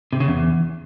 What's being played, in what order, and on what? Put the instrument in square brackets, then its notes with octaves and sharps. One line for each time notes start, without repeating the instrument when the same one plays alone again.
[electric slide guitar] C3
C#3
E2